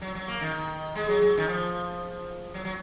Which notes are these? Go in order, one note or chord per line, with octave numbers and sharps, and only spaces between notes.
F#3
F#3
A#3
D#3
G#3
F#3
F#3
D#3
F3
F#3
F#3